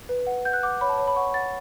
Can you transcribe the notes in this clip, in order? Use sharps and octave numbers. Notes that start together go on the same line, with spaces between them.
B4
F#5
F#5 G6
F#6
F#5 D6
C#5 B5
A5
C#5
B5
F#5 C#6
F#5 A6